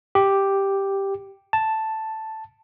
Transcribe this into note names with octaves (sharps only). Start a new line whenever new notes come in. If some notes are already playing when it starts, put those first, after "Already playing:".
G4
A5